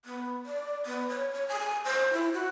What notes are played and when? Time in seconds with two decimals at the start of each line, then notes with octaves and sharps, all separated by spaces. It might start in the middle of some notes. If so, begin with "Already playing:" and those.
0.05 B3
0.45 D5
0.86 B3
1.09 C#5
1.32 C#5
1.48 G#5
1.85 C5
2.13 E4
2.33 F#4